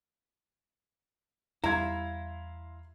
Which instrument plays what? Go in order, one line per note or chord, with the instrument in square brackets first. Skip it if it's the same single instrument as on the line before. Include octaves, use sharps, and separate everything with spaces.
[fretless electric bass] E2 G3 [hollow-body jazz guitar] E4 [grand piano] E5 F5 C6 [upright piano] A#5 G#6